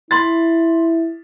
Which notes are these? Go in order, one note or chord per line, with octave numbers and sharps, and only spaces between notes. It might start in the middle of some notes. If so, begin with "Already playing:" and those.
E4 B5 C6 A6